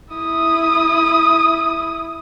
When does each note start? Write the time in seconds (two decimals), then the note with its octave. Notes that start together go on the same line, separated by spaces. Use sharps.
0.14 E4 D#6